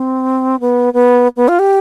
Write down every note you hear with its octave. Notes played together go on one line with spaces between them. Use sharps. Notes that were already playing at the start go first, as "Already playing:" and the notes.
Already playing: C4
B3
B3
B3
F4
G4